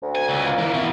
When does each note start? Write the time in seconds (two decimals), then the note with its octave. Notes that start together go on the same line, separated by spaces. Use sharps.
0.02 D2
0.15 G#5
0.29 C#2
0.46 A#3
0.59 E3
0.74 B2